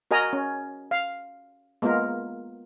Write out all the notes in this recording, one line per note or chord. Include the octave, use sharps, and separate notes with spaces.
F#4 A#4 D#5 G#5 A#5
C#4
F5
G#3 A#3 B3 F4 A#4